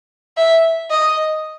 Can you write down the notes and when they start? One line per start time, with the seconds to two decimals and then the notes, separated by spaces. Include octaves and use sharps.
0.38 E5
0.91 D#5